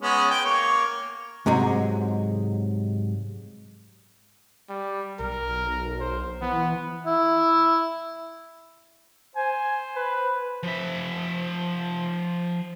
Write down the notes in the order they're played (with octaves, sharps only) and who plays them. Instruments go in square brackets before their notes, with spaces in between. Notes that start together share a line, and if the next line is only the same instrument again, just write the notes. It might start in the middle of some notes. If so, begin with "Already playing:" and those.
[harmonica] G#3 B3 C#4
G5
A#3 C#5
[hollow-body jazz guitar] G#2 C3 F#3 G#3
[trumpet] G3
[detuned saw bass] B1 [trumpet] A#4
[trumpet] C5
[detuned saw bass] E3 [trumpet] B3
[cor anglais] E4
[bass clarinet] C5 [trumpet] G#5
[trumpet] B4
[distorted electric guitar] F3 E5